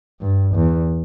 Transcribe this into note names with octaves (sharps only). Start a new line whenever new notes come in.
G2
E2